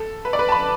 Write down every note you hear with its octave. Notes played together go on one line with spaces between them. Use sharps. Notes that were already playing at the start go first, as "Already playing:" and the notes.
Already playing: A4
B4
D5
B4
A5
B5